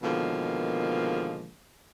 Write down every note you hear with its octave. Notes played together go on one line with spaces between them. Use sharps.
B2 D3 D#3 F3 G#3 A#3